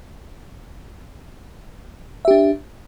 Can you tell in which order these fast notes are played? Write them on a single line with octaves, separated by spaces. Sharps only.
E5 G4 D4